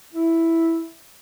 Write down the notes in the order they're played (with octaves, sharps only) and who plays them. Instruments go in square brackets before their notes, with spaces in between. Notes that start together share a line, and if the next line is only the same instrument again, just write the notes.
[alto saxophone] E4